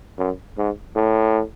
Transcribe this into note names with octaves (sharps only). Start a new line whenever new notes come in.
F#2
G#2
A2